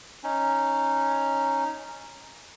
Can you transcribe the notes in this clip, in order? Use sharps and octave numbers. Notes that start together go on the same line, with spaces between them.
C#4 D#4